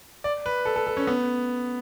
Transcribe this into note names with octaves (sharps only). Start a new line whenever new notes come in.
D5
B4
A4
A4
A4
C#4
B3